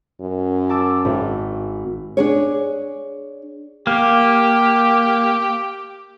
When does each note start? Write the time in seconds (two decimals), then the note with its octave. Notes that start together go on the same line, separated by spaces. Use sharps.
0.21 F#2
0.69 A5 D6 E6
1.05 G#1
2.17 D4 G#4 C#5
3.87 A#3 G4